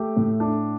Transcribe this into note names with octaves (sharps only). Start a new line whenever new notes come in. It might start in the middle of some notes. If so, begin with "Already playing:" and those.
Already playing: A3 G4
A2
D4